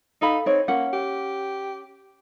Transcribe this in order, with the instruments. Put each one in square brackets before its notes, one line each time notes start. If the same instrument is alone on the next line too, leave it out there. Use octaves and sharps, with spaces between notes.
[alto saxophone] D#4 [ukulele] A4 F5 B5
[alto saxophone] C4 [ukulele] D#4 C#5
[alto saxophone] A#3 [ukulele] C#4 F#5
[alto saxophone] G4